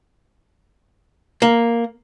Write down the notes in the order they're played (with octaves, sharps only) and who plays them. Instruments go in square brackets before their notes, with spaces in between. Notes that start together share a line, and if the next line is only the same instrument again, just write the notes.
[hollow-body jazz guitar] A#3